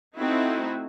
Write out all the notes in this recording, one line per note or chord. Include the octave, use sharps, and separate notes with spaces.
A3 C4 D#4 E4 F#4